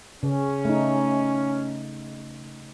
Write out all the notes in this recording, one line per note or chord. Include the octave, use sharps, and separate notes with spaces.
C#3 C#4
A3 D#4